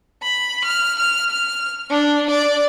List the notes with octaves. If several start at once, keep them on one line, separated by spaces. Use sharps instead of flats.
B5
F6
F6
F6
D4
D5